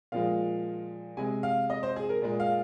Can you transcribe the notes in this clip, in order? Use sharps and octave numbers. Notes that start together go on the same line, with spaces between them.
A#2 F3 G#3 F5
C3 G#3 G#5
F5
D#5
C5
G#4
A#4
A#2 G#3
F5